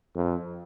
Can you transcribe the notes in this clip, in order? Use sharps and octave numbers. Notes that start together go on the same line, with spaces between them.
F2